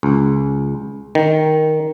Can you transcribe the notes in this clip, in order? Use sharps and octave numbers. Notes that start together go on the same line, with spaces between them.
C#2
D#3